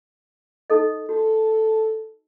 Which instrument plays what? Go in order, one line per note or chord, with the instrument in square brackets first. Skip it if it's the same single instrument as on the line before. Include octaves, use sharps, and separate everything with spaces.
[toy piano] D#4 A4 D#5
[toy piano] F#4 [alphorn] A4